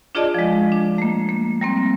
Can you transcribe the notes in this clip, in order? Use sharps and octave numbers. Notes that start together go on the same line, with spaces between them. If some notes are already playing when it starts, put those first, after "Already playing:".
D4 F4 G#4 D5 D#5 A5
F3 G#3
D4
A3 A#3
A#3
G3 A#3 C4